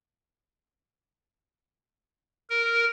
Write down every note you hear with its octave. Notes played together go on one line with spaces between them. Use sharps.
A#4